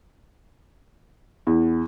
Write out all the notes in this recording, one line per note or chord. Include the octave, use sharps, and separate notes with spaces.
E2